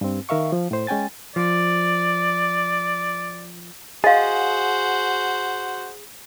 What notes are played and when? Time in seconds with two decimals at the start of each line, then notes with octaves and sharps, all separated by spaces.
0.01 G2 C4
0.29 D#3 A#4 E5 F5 C#6
0.52 F3
0.71 A2 C5
0.87 G#3 C#4 G5 G#5 A6
1.36 F3 D5
4.04 F#4 G#4 C5 D#5 F5 F#5